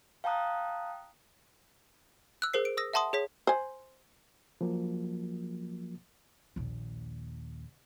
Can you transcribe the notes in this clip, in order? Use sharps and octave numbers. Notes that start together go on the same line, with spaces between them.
F5 G5 A5 A#5 D#6 F#6
E6 F#6
G#4 A#4 C5 C7
D7
D#6 E6 A#6
E5 F#5 A5 C6 D#6
G#4 C#5 B6
C5 G#5
F3 F#3 A#3
A#1 D#2